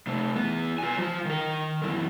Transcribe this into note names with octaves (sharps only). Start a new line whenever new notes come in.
C3 A3
E2 B3
F4 G#5
F3 F4
D#3 A#4
F#2 E3